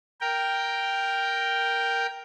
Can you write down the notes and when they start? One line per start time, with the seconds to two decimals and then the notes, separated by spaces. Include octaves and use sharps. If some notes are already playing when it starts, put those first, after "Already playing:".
0.21 A#4 G5